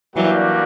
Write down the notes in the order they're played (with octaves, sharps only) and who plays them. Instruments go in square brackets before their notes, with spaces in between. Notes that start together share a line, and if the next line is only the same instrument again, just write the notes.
[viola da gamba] E3 F#3 [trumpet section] G3 A#3 D4 F#4